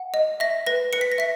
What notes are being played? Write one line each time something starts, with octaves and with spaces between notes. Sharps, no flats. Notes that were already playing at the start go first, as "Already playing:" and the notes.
Already playing: F#5
D#5
E5 A#6
B4 A#6
B4 C#7
B6
A#6
E5 B6